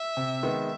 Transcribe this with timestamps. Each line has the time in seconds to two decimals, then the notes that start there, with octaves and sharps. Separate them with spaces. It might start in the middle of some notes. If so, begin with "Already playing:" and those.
Already playing: E5
0.17 C3
0.43 D#3 G#3 B3